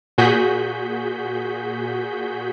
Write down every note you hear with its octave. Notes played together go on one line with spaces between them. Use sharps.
A#2 F#4 G#4 G6 B6